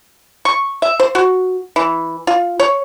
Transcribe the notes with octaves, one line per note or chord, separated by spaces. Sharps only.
C#6
E5
C5
F#4
E3
F4
C#5